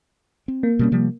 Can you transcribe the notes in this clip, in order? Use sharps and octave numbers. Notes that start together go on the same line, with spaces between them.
C4
A#3
B2 G3 C#4
C3 F3 G3